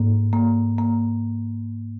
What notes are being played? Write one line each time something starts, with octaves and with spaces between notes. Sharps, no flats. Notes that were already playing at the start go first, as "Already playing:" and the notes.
Already playing: G#2 A#3
A#3
A#3